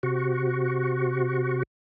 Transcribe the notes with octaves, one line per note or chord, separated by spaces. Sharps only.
C3 F#4